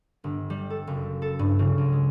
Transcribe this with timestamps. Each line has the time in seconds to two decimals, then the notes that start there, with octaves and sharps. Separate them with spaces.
0.24 G1
0.50 G3
0.70 A4
0.87 F#1
1.22 A4
1.39 G2
1.59 C#3
1.78 C#2
1.92 G#3